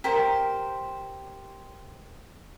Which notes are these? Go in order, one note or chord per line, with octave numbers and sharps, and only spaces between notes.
G4 A#4 C5